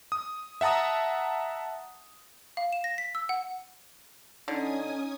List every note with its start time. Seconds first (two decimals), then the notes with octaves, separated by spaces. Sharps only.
0.12 D#6
0.61 E5 F#5 A5 A#5 D#6
2.57 F5
2.73 E7
2.84 A#6
2.98 B6
3.15 E6
3.29 F#5
4.48 D3 C#4 D#4 G#5 D#6